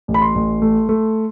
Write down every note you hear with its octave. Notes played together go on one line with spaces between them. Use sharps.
A1
B5
C6
A1
A3
A3